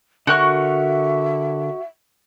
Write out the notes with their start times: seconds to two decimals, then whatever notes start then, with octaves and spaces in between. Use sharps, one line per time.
0.27 D3 F#4 A#4 E5 C#6 F#6